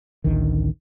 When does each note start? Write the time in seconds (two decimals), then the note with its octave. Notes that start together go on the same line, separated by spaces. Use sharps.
0.24 A1 D2 D#3